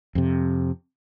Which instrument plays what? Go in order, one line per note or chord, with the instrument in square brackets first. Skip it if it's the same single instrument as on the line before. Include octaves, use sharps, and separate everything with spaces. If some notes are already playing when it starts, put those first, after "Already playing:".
[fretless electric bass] F2 C3